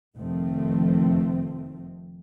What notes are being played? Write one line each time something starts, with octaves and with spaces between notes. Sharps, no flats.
F1 D#3 F3 A3 C4